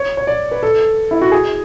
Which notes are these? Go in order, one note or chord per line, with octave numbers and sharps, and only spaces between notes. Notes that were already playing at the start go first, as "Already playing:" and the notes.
Already playing: C#5
C#5
D5
B4
A4
E4
F#4
G#4